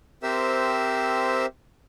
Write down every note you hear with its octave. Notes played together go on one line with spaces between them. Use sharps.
C4 G4 A#4 C5 E5 E6